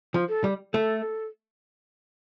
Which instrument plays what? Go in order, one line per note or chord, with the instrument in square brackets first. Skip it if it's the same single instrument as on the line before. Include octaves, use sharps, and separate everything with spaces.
[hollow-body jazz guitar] F3
[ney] A4
[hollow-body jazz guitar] G3
[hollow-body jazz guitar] A3 [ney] A4